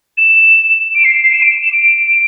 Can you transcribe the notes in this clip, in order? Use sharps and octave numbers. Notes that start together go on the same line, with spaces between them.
E7
D7
C7
C7
E7
D7
E7
D7